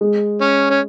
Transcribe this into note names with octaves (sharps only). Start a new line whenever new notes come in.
G#3
C#4
C#4